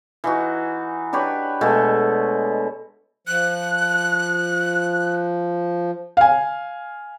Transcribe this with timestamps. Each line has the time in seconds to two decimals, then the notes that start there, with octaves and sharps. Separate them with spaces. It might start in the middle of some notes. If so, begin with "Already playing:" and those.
0.24 E3 D#4 F#4
1.13 D4 G4 B4 C#5
1.61 B2 G#3 A3
3.27 F3 F#6
6.17 F5 G#5